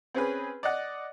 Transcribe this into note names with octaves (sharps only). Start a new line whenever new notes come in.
C4 C#4 G#4 B4
D5 D#5 F#5